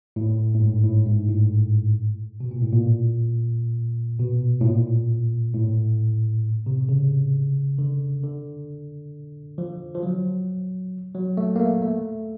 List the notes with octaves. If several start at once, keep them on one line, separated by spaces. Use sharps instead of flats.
A2
A2
G#2
A2
G#2
A2
B2
A#2
A2
A#2
B2
A2
A#2
A2
C3
C#3
D3
D3
F3
F3
F#3
F#3
A3
A#3
A3
A3